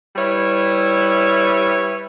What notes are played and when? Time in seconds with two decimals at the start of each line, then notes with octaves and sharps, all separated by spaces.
0.16 G3 E4 B4 C#5